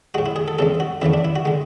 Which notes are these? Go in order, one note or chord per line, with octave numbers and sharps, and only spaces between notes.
A2 G#3 F#4
E4
G#4
A4
E2 C#3 G#3 A4
F#4
E2 C#3 E3 A3 E4
D4
E4
F#4
D3 G#3